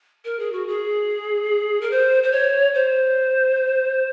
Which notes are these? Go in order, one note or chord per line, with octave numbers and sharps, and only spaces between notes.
A#4
G#4
F#4
G#4
A#4
C5
C5
C#5
C5